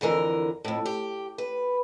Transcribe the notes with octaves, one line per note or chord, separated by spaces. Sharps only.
F2 D3 E3 A#4
F2 A2
G4
B4